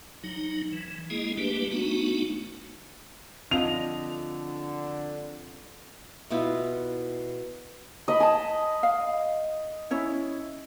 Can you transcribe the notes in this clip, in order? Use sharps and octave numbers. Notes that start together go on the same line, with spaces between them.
F#3 D#4
E3
G#3 A#3 E4 G#4 D#5
G3 A3 A#3 D4 G4 B4
A3 B3 D4 D#4 F#4
D3 F3 C4 D#5 F7
B2 B3 E4 F4
D#5 B5
G#5 A5 D#6
F5
C#4 E4 C#5